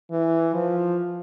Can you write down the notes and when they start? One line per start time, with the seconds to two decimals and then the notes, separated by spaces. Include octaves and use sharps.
0.11 E3
0.54 F3